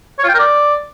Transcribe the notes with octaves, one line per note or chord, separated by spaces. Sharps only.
C#5
F4
G5
A#4
D5